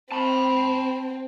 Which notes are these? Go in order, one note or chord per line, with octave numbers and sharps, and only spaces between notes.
C4 A5 B5